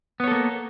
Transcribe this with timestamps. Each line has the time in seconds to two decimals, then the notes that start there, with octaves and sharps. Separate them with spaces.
0.20 B3
0.24 C#5
0.28 A4
0.31 A#3